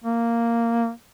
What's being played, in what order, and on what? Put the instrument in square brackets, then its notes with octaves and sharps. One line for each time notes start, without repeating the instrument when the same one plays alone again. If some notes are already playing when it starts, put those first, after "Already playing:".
[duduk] A#3